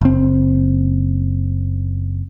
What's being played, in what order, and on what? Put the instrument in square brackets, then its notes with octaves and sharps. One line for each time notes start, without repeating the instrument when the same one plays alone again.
[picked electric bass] F#1 C4